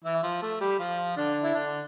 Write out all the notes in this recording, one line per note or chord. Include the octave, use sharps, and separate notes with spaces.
E3 E4
F3 F4
A3 A4
G3 G4
F3 F4
D3 D4
E4
D3 D4